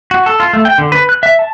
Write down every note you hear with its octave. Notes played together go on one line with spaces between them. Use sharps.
F#4
A4
F4
A3
G5
D3
B4
F#6
E5
A5